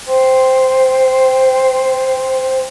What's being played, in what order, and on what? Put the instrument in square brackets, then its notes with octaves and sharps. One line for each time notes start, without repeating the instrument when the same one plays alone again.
[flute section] C5 G5 C6